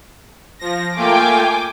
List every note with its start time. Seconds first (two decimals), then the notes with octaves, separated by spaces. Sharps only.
0.59 F3 A#6
0.96 A3 A#3 F4 G5 G#5 D6